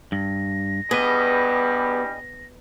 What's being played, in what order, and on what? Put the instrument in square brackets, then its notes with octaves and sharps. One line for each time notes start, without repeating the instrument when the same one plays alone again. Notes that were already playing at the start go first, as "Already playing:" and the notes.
[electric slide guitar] G2 [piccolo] A#6
[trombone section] E2 G2 G3 [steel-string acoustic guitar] B3 [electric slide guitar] G#4 B4 D#5